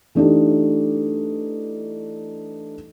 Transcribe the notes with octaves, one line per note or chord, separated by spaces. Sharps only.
E3 A3 D4 D#4 G4